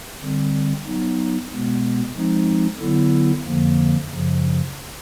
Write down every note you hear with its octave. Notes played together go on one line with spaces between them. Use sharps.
D3 G3 C4
F#3 B3 D#4
B2 G#3 B3
F3 G#3 C4 D#4
D3 F#3 B3 E4 A4
F2 D3 F3 A#3
F#2 C#3 F3